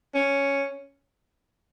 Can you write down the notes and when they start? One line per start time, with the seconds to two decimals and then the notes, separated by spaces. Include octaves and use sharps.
0.14 C#4